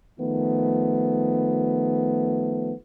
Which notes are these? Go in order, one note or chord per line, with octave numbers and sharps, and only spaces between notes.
D#3 F3 A3 B3